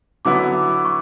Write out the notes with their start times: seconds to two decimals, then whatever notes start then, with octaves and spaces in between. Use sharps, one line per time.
0.25 D3 F#3 B3 E4 D6
0.85 C#6